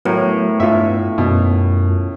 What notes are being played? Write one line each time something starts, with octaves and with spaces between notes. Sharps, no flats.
A2 F#3 B3 A#4
G2 A3 B3 F4 E5
F#2 B2